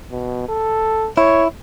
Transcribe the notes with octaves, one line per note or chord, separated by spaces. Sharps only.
B2
A4
E4 C#5